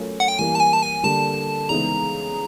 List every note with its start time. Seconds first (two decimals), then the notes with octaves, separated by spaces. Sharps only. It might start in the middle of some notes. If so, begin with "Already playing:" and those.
Already playing: F#3 A3 C#4 F4 A#4
0.20 F#5
0.28 G5
0.39 E3 G3 A#3 G#5
0.55 A5
0.60 G#5
0.73 A5
0.83 G#5
1.04 D3 G3 A#3 A5
1.69 C#3 E3 G#3 B3 D#4 A#5